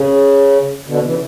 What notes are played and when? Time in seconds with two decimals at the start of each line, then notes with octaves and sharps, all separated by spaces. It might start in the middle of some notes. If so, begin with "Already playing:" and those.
Already playing: C#3
0.87 B2 D3
1.03 C#3 E3